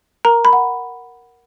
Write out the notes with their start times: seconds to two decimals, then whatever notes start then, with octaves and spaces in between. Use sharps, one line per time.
0.25 A#4 A#5
0.45 B5
0.53 F#5